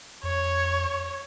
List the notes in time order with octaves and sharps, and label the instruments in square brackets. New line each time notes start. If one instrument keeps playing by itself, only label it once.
[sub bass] F2 [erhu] C#5